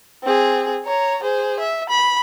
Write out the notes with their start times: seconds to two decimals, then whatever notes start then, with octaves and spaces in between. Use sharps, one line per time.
0.23 C4 G#4
0.85 C#5 A#5
1.23 G#4 C5
1.59 E5
1.89 B5